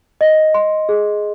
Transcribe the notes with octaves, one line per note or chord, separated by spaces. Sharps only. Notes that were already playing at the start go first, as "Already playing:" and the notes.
D#5
C6
G#4